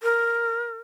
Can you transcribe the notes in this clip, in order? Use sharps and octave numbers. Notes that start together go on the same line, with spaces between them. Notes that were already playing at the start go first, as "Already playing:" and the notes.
A#4